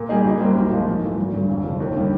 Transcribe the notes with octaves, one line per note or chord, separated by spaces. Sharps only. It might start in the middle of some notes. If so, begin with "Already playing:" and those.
Already playing: A#2
G3 A#3 D#4 G#4
F#1
F#2 D#3 G3 C4
B1
A#2 F3 G#3
G#2
E3 A3
G#1
G2 D3
F2
C3 F3
D#2
D3 G3